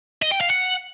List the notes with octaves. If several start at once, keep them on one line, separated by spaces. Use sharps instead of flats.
D#5
G5
F5
F#5